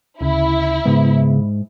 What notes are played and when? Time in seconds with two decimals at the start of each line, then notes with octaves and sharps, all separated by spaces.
0.21 D2 C#3 E4
0.86 G#2 C#3 B3